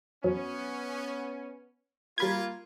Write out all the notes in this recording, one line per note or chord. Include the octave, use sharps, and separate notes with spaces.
F2 F#3 B3 C#4
G3 A#3 F4 B5 G#6